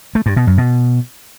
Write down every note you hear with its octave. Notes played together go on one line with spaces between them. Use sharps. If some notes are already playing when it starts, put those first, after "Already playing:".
A3
G2
B2
F#2
B2